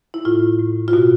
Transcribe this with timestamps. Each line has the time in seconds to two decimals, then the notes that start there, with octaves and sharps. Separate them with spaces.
0.14 E4
0.25 A2 F4
0.59 A2
0.88 F4
0.93 B2 F#4